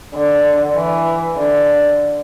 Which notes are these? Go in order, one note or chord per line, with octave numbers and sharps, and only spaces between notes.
D3
E3
D3